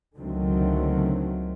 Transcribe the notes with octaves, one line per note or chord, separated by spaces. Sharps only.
C#2 D3 D#3 F#3 A3 C4